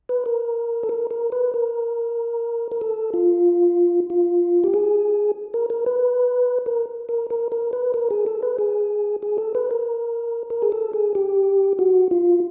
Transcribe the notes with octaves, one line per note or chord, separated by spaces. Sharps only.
B4
A#4
A4
A#4
A#4
B4
A#4
A#4
A4
F4
F4
G4
G#4
A#4
A#4
B4
A#4
A#4
A#4
A#4
B4
A#4
G#4
A4
B4
G#4
G#4
A4
B4
A#4
A#4
G#4
A4
G#4
G4
F#4
F4